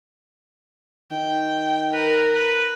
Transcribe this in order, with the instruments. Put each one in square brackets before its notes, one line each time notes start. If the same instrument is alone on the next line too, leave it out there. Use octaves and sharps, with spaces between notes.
[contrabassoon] D#3 [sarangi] G5
[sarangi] A#4 [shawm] B4
[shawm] B4